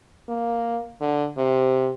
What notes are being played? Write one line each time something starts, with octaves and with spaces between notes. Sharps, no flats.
A#3
D3
C3